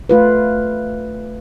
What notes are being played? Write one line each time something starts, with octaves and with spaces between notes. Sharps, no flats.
A3 F4 B4